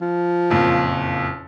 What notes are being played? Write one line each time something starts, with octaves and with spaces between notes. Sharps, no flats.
F3
F#1 F2 A#2